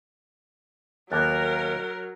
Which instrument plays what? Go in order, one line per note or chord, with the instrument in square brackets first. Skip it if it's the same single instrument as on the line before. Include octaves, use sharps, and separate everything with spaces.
[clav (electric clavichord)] D#2 A#3 B3 [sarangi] F#3 [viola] A#4 [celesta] F#6 A6